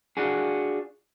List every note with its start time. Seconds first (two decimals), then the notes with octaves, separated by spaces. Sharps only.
0.17 D4 F4 F#4 G#4